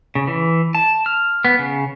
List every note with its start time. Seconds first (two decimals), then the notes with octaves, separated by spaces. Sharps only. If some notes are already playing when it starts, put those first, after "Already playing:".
0.15 C#3
0.27 E3
0.75 A5
1.06 F6
1.45 B3
1.59 C#3